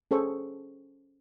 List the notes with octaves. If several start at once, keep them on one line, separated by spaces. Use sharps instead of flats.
C#4 G#4 A4 C5 C#6